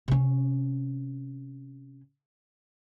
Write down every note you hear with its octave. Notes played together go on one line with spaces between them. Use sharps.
C3 C#4